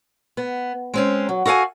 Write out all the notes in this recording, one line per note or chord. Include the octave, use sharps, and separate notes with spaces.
B3
G#3 C4 C#4
F#3
F#4 A4 F5 F#5 G#5